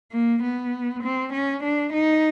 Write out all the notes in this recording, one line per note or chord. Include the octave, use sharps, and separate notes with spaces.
A#3
B3
C4
C#4
D4
D#4